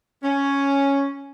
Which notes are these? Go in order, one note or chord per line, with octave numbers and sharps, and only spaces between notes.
C#4